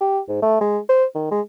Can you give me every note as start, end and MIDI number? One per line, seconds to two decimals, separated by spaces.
0.01 0.19 67
0.29 0.37 44
0.42 0.58 57
0.61 0.78 56
0.89 1.05 72
1.15 1.27 51
1.31 1.41 56